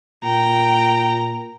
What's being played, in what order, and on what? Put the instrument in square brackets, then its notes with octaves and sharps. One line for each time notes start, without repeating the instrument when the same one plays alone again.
[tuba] A#2 [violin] G5 [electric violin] A#5